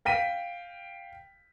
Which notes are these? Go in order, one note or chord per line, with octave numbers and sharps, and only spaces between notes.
F5 G5 B6 D#7